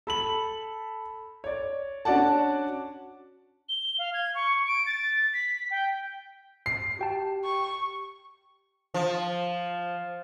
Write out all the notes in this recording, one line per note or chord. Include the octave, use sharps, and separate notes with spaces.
A4 B5 F#7
C#5 D5
C#4 D4 F#4 D5 F#5 A5
G7
F5
G#6
C#6
D7
A6
B6
G5
C7
F#4 G4 G5 A5
C#6
F3